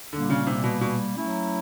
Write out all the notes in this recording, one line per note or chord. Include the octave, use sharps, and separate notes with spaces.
A#2 D3 G3 A#3
C#3
C3
B2
B2
F#3 A3 C#4 E4